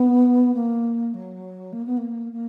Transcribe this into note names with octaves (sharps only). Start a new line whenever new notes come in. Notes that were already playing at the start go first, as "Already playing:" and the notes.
Already playing: B3
A#3
F#3
A#3
B3
A#3
A#3